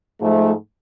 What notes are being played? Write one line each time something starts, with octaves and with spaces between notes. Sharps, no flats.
G#2 F3 A3